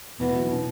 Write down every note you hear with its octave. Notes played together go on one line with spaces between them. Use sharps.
E2 B2 E3 B3
F#3
B2
C#3